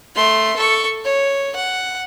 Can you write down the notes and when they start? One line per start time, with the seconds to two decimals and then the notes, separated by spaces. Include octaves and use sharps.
0.15 A3 C6
0.57 A4 C#6
1.04 C#5
1.56 F#5